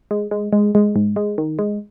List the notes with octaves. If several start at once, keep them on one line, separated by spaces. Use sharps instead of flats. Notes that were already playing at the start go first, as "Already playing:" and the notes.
G#3
G#3
G#3
G#3
G#2
G#3
D#3
G#3